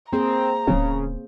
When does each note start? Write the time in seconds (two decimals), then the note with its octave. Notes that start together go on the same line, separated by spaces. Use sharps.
0.13 A#3 C4 G#4 C5 A#5
0.67 D1 C#3 A#3 C4